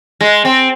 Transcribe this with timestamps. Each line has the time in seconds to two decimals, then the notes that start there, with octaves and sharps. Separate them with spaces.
0.21 G#3
0.45 C4